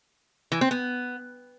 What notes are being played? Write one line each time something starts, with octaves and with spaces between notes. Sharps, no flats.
E3
C4
B3